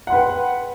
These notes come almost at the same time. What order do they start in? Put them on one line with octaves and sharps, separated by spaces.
F#5 C6 B4 G5